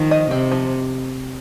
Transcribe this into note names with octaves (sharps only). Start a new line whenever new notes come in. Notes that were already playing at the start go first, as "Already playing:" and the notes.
Already playing: D#3 F3
D#5
C3 C4
F3